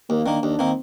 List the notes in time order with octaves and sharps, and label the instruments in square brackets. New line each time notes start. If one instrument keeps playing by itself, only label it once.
[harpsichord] D#2 [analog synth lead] A#3
[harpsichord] D#3 A#3 [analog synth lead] D4
[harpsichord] D#2 [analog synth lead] D4
[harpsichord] D#3 A#3 [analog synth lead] C4